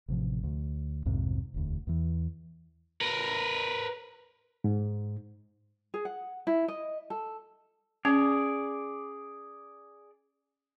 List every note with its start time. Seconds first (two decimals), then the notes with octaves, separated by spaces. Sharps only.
0.08 A1 C3 F3
0.43 D2
1.05 B1 F2 G#2 C3
1.54 E1 D2
1.87 E2 E3
3.01 A#4 B4
4.64 G#2
5.94 G#4
6.05 F#5
6.47 E4
6.68 D#5
7.10 A4
8.05 C#4 G#4 D5